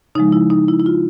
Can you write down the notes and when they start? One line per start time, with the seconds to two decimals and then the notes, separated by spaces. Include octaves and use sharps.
0.15 C#3 F3 G#3 D#4
0.32 E4
0.50 D#4
0.68 E4
0.80 E4
0.86 F4